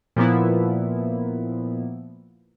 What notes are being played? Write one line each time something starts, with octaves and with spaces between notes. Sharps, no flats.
A#2 F3 A#3 B3 E4